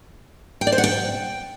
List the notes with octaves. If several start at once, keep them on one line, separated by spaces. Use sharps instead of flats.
G5
D5
C5
F#5
G5